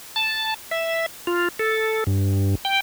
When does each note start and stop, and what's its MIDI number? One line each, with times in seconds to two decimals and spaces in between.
0.16 0.54 81
0.71 1.06 76
1.27 1.49 65
1.59 2.04 69
2.07 2.55 43
2.65 2.80 79